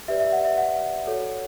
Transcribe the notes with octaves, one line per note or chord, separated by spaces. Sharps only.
G4 B4 D5 E5
E5
F#5
E5
F#5
F#4 A4 C#5